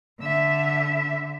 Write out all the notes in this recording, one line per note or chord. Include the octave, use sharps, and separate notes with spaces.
D3 E5